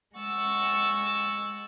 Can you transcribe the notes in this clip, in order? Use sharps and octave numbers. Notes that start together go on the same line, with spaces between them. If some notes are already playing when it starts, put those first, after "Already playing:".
G#3 F#5 C#6 E6 A6